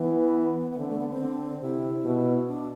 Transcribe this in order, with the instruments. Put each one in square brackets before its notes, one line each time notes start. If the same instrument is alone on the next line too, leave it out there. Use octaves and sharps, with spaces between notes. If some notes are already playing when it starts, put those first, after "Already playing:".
Already playing: [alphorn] E3 [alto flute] B3
[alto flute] B3
[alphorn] D3 [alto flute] C4
[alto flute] A3
B3
C4
[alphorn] D3
[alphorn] C3 [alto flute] E4
[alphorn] B2
[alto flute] D4